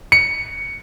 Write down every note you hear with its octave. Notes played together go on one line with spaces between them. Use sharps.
C#7